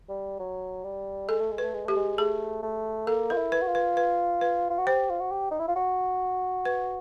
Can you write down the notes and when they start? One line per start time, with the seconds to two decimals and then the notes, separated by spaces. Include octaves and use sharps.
0.09 G3
0.40 F#3
0.84 G3
1.29 G#3 A4
1.40 A3
1.51 G#3
1.58 A3 B4
1.74 G#3
1.85 A3 G4
1.97 G#3
2.18 A3 G#4
2.63 A3
3.07 A#3 A4
3.30 F4 A#4
3.37 E4
3.52 B4
3.62 F#4
3.67 F4
3.75 B4
3.97 B4
4.41 B4
4.70 F4
4.78 F#4
4.87 G4 C5
5.10 F4
5.20 F#4
5.31 G4
5.51 D#4
5.60 E4
5.68 F4
5.76 F#4
6.65 B4